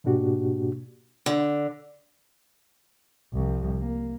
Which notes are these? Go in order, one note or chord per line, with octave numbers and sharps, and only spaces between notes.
G#2 B2 A#3 D4 F#4 G4
D3
C2 F3
A#3